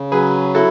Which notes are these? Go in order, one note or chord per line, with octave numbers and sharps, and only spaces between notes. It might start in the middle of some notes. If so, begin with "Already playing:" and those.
Already playing: C#3
F#3 G#4 B4
E4 F#4 A4